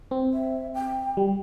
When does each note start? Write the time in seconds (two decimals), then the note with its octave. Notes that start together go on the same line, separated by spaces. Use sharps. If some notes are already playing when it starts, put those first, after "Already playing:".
0.11 C4
0.34 E5
0.74 G5
1.17 G3